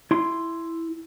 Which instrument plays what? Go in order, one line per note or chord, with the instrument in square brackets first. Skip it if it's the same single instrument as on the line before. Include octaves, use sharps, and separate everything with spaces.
[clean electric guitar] E4 C6